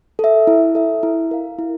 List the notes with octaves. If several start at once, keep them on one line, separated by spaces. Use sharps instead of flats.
A4 E5
E4
A4 E5
E4
A#4 F5
E4